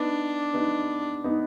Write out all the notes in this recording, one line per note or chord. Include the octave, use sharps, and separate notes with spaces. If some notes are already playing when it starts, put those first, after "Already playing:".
Already playing: B3 D4 D#4 B4
B3 D#4 B4
B3 D#4 B4